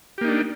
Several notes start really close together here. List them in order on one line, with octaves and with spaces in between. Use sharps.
G4 A#3 D#4 D4